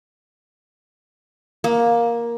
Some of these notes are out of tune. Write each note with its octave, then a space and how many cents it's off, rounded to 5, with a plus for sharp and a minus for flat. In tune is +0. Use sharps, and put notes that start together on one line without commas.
A#3 +10